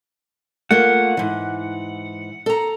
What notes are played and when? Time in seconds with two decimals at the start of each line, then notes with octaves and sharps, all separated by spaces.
0.71 A3 A#3 F4 F#5
1.17 G#2 E3
2.46 A4 A#5